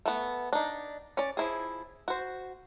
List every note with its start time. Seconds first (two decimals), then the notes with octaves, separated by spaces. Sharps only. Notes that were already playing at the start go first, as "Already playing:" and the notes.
0.06 A3 B3
0.53 D4 D#4
1.17 C#4 D5
1.37 F3 E4 G#4
2.08 F#4 C5